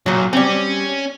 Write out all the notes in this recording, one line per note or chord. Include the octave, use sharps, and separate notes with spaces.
B1 A#2 F#3
G3 C4 C#4